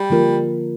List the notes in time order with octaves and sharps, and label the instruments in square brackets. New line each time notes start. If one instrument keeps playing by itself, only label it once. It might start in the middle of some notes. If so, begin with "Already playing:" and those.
Already playing: [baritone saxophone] G3
[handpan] D3 F3 A#3 F4 A#4